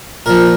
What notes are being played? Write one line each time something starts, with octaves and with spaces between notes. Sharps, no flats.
A#2 F3 A#4